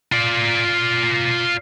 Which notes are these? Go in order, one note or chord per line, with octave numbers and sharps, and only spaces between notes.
F4 D5